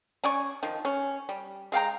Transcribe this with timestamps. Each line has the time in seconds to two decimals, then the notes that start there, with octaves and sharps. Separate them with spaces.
0.24 C#4 D5 G#5 C#6
0.63 D#3 F3
0.85 C#4
1.29 G3
1.72 G#3 F5 G5 A#5